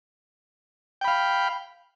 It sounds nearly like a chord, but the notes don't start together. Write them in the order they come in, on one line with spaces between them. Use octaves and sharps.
G5 B5 F5